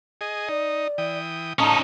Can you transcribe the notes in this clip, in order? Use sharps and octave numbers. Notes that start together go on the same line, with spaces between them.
G#4 D#5
D#4 D5
E3 G5 D#6
A2 C#4 D#4 D#5 F5 A5 A#5 D#6